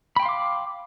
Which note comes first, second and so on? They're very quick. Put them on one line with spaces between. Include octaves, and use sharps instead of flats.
B5 G5 C6 F5 D6